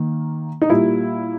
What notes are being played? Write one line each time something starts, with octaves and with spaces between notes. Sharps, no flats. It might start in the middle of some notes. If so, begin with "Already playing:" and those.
Already playing: D#3 A#3
D#4
A#2 G3 A#3 E4